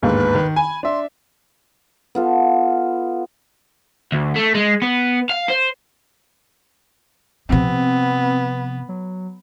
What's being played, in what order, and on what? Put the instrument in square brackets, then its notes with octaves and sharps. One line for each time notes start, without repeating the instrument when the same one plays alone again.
[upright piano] G1 D#2 G#2 [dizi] B4
[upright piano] D#3
[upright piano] G#5 [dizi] B5
[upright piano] D4 E5 [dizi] C6
[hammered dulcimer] B3 F4 A4
[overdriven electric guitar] D2
A3
G#3
B3
F5
C5
[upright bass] C3 F3 [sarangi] B3 [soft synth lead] C4
[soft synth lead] F#3